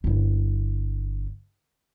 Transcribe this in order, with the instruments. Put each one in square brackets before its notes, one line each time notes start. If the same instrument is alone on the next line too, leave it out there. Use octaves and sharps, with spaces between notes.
[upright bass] G1 E4